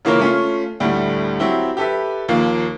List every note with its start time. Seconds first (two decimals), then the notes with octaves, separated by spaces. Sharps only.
0.05 C#3 E3 A#3 F4 A#4 C#5
0.19 A3 C#4 F4
0.80 D2 A2 G3 A3
1.39 F#3 C4 E4 G4
1.77 G4 A4 B4 E5
2.28 D#2 F3 A#3 F5